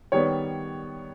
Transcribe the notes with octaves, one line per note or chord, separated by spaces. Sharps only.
D#3 G3 B3 C#5